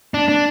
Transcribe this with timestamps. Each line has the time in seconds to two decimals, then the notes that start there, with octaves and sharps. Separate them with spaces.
0.14 D4
0.29 D4